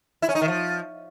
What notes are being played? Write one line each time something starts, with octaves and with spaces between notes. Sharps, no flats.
E4
C#4
D#4
D#3
F3